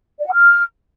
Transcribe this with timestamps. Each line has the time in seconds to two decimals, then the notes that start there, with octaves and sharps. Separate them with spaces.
0.19 D5
0.26 F#5
0.33 F6